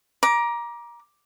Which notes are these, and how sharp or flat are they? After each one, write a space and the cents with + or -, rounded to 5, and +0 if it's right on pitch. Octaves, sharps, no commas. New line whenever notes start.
A#5 +25 D6 +0